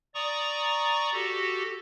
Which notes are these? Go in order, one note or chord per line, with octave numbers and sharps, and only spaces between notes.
D5 A#5 C#6 D#6
F#4 G4 A4